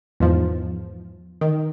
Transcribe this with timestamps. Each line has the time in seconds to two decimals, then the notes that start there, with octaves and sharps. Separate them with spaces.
0.20 E2 G#2 F3
1.41 D#3